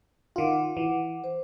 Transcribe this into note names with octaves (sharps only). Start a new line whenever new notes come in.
D#3 F4 F#5 D6
E3
C5